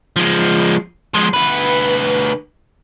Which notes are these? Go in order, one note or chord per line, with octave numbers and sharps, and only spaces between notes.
F3 G#3
F3 G#3
D2 B4